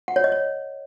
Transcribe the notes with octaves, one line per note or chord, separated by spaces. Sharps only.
F#5
C#5
D#5
C#5